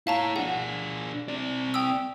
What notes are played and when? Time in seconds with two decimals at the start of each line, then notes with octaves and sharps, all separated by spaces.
0.07 E4 C#5 F5 A5 A#5
0.36 D4 G#4 F#5
1.28 C4 D5
1.74 G5 D#6 E6